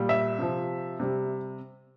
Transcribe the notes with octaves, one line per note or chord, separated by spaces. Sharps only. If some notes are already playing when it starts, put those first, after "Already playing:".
Already playing: A#2 G3
E5
C3 F3
C3 G3